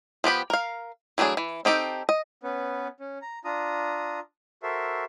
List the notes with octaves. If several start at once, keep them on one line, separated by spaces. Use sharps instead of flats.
F3 B3 G4 B5
A#4 F5
E3 F#3 A3 D4 G#4
E3
C4 D#4 G4 A4
D#5
B3 C#4 B4
C#4
A#5
D4 F4 A#5 D#6
F#4 A4 A#4 C5 E5